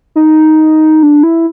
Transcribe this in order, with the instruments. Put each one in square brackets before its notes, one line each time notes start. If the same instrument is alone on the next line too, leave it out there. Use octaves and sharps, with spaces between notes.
[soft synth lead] D#4
D4
E4